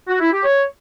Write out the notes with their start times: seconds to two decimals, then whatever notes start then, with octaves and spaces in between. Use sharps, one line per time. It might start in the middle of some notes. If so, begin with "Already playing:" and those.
0.08 F#4
0.20 E4
0.32 G4
0.44 C#5